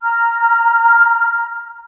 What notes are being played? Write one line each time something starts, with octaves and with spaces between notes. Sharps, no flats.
A#5 F6